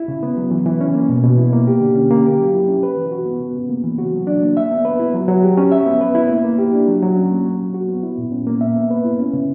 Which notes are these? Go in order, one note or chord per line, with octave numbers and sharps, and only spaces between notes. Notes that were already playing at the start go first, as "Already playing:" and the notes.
Already playing: E4
C#3
B3
F#3
E3
E3
C#4
A#3
B2
B2
E4
A#3
G4
D3
C#4
A#3
G4
F#3
E4
C#4
B4
E3
F#4
B3
C#3
C#3
A#3
E3
F#4
F#3
D4
A#3
E5
B3
B4
E4
F#3
F#3
G4
C#4
E5
B3
B4
E4
A#3
A#3
G4
D4
F#3
F#3
C#4
A#3
F#3
F#3
F#4
B3
E4
A#2
C#4
A#3
E5
B3
B4
E4
C#4
C#3